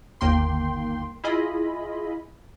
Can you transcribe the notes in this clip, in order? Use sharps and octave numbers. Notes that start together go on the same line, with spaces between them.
G1 D#2 A#3 G5 C6
E4 F4 G#4 D#5 B5